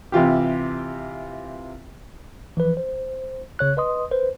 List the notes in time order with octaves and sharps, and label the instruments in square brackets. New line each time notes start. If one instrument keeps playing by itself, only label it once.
[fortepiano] C3 E3 F4 G4
[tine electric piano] E3 F3 B4
C5
C#3 C#5 F#6
B4 D#5 C6 D#6
B4 C5